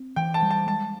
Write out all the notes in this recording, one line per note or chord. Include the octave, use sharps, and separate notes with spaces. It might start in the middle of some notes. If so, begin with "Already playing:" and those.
Already playing: C4
E3 G5
A5
G3
A5
G#3 A5